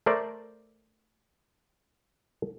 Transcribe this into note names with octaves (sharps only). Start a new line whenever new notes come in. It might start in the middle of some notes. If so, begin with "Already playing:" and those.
A3 A#4 C5 D5